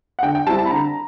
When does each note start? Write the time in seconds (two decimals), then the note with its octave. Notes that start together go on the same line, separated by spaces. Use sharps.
0.19 F#5
0.23 D3 G5
0.35 G5
0.47 G3 C4 E4 A5
0.59 A5
0.65 B5
0.70 D3 A#5